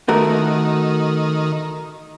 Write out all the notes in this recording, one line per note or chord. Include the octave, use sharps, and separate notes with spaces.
D#3 A3 F#4 A#4